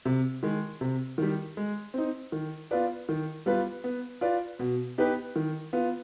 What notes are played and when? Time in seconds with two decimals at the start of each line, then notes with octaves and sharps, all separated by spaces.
0.05 C3
0.43 D#3 G#3
0.81 C3
1.18 D#3 G3
1.57 G#3
1.94 C4 D#4
2.32 D#3
2.71 B3 F4 B4 D5
3.09 D#3
3.46 G3 B3 F4 B4
3.84 B3
4.21 F4 B4 D5
4.59 B2
4.98 B3 D#4 G4 B4
5.36 D#3
5.73 B3 F4